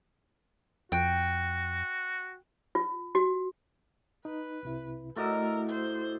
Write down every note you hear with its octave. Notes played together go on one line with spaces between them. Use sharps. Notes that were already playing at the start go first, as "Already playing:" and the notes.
F2 F#4 G5
F4
F#4
D#4 B4
C2 C3 E4
A2 A3 F#4 A#4 D5 D#5 E6
C5